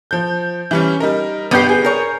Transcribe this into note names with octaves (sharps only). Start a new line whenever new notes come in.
F3 G6
E3 G3 C#4
G3 D#4 A#4
G1 B3 G4 G6 C7
G#4
A#4 C#5